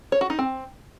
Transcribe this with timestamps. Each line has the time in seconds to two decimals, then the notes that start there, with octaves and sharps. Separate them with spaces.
0.12 C#5
0.21 F#4
0.30 D#4
0.39 C4